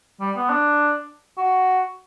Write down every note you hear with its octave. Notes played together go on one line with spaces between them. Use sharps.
G3
B3
D4
F#4